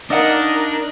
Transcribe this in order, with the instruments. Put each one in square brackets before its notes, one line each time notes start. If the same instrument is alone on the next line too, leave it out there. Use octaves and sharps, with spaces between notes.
[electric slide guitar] D4 [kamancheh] D#4 A#4 [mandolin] D#5 F5 F#5